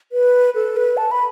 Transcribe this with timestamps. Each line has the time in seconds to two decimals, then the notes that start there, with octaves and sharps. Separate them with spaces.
0.12 B4
0.55 A4
0.77 B4
0.97 A5
1.11 B5